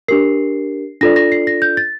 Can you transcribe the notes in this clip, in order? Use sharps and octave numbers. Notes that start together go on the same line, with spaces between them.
D4 G4 A#4 C7
D4 F4 A4 D5 A#6
A#6
C7
A#6
G6
A6